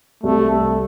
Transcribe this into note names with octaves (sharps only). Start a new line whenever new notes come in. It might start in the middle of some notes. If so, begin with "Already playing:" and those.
C2 C3 G3 A3